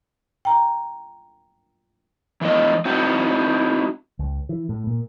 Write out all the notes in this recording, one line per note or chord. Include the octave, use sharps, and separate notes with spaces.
G5 A#5
E3 A3 B3 D#5
C4 D#4 E4 F#4
C#2
E3
A2
A#2